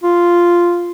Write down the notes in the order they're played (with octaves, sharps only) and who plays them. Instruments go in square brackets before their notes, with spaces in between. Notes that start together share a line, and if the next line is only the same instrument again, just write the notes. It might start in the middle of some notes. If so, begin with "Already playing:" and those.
[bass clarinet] F4